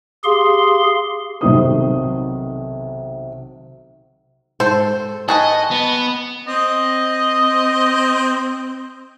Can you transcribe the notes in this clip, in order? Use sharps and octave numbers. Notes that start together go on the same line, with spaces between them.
G4 G#4 F5 C6
B1 C3 D#3 D#6
G#2 A4 C5
G#4 B4 D#5 G#5 A5 C#6
B3
C4 D#5